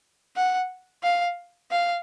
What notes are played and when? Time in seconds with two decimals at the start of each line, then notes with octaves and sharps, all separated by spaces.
0.36 F#5
1.03 F5
1.71 F5